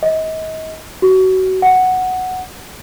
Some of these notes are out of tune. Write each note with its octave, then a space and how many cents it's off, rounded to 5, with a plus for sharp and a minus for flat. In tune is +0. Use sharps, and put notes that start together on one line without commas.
D#5 +35
F#4 +25
F#5 +0